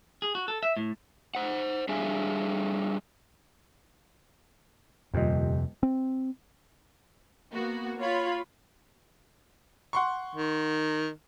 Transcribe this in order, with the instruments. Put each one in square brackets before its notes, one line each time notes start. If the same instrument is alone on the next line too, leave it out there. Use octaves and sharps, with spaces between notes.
[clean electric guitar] G#4
F#4
A4
E5
A2
[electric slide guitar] C5 F#5
G3 D4 G#4 E5 F5 G#5
[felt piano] D#1 D#5 [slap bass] F2 C3
[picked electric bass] C4
[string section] A#3 B3 F#4
F4 C#5 B5
[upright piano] F#5 C6 C#6
[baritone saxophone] D#3